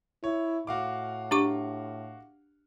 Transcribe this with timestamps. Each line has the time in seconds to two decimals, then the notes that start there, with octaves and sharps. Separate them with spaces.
0.24 E4 C#5
0.67 A2 F#4 F5 D6
1.31 D4 G4 C#6